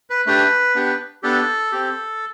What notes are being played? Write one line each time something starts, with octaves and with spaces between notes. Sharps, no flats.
B4
A3 D4 G4 B4
B3 D4 G4
B3 D4 G4 A4
C4 G4